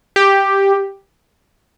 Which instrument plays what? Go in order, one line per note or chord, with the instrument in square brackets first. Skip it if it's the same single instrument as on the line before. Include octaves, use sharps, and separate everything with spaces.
[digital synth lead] G4